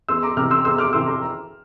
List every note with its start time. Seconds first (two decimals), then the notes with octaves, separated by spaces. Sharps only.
0.08 E2 C6 E6
0.23 A#5 D6
0.37 C3 E3 D6 F6
0.50 C6 E6
0.65 E2 C6 E6
0.78 D6 F6
0.93 C3 E3 C6 E6
1.06 A#5 D6